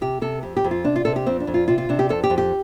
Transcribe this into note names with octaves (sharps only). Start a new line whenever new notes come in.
C3 G4
C3 A4
F2 G4
G4
F2
F4
C3 D4
F4
C3 A4
G4
F2 C4
D4
F2
F4
C3 F4
F4
C3 D4
G4
F2 A4
G4
F2
G4